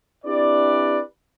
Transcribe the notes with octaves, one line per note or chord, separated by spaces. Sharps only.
C4 D4 E4 G4 B4 D5